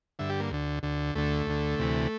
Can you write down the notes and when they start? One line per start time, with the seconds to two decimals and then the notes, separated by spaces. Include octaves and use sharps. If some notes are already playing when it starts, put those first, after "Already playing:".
0.19 G2 D3 E5
0.29 G4
0.40 A#3
0.51 D2 D3
0.83 D2 D3
1.15 D2 D3 A3
1.47 D2 D3
1.79 D2 C3 E3